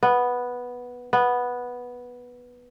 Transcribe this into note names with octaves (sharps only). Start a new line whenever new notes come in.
B3
B3